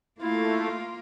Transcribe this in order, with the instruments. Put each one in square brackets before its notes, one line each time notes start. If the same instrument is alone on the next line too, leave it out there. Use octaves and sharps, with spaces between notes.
[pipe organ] A3 [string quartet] A#3 F4 [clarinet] E4